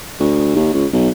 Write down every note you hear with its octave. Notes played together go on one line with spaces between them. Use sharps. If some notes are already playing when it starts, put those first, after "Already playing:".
D2
D#2
C#2
B1